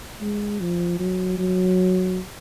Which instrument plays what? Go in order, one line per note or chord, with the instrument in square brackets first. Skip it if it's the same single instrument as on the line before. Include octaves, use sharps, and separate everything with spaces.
[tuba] G#3
F3
F#3
F#3